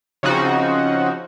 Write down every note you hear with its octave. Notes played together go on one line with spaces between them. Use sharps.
C#3 F3 C4 D#4 F#4